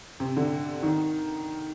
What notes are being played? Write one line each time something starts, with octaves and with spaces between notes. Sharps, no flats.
C3
D3
D#3